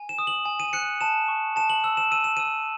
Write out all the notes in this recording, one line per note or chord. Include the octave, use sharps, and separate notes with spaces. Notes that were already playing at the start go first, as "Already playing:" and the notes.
Already playing: G#5
E7
D#6
F#7
G#5
D#7
F#6 C#7
A5 E7
C#6
A5 E7
F#7
E6 F#7
E7
E6 D#7
E7
E6 D#7